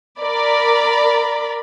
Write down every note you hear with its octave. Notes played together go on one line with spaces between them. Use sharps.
A#4 D5 B5